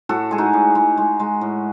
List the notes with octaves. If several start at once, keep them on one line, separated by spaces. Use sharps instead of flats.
A2 F#4 A4
G#3 G#4
D#4 F#4
A2
G#3
G#3
G#3
A2